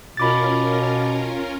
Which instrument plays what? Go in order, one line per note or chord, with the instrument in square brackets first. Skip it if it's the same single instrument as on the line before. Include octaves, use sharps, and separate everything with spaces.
[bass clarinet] B2 [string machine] C#4 F4 A#4 [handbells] B5 D6 A6